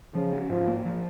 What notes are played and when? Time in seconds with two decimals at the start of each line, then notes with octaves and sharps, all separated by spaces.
0.15 C#3 F3
0.33 C#4
0.50 G#2 F3
0.67 A#3
0.85 F3